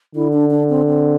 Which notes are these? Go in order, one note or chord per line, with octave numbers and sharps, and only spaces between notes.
D3 E4
D4
D4
C4
C4